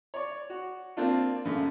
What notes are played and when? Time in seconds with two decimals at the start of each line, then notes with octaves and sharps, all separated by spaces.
0.14 C#5 D5
0.50 F#4
0.97 A#3 C4 D4 F4
1.45 F#2 C#3 A3